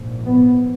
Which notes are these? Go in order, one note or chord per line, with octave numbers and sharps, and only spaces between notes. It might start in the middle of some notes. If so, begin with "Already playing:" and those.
Already playing: A#1 G#2
B3